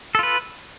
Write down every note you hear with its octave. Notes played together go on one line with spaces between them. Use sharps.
F4 A4 B4